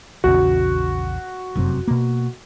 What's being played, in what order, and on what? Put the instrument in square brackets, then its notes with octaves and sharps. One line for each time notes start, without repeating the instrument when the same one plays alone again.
[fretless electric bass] A#1 E2 C#3 [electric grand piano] F#4
[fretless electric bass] F1 F#2 C3
B2 A#3